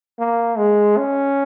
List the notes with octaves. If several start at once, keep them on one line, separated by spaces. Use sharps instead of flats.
A#3
G#3
C#4